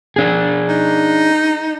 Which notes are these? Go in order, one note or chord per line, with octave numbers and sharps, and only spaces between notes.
D4 G#4
D#4